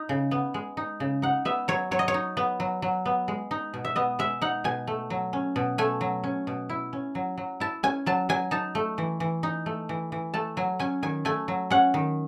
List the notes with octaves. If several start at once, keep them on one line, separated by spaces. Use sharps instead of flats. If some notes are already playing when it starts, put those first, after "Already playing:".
Already playing: D#4
C#3
B3
G#3
D#4
C#3
D#4 F#5
B3 E5
F#3 C#5
F#3 C#5
D#5
C#5
D#4
B3
F#3
F#3
B3
G#3
D#4
B2
E5
B3 D#5
G#3 E5
D#4 F#5
B2 G#5
A3
F#3
C#4
B2
A3 G#5
F#3
C#4
B2
E4
C#4
F#3
F#3
E4 A5
C#4 G#5
F#3 A5
F#3 G#5
D#4 A5
A3
E3
E3
D#4
A3
E3
E3
A3 A5
F#3 G#5
C#4 G#5
D#3 G#5
A3 G#5
F#3
C#4 F#5
D#3